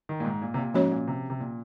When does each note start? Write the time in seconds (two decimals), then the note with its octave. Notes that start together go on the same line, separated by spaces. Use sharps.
0.09 D#3
0.20 A#2
0.25 G#2
0.42 A#2
0.54 C3
0.57 A#2
0.74 G#2 F3 A#3 C#4 F#4 C#5
0.91 A#2
1.08 C3
1.30 C3
1.40 A#2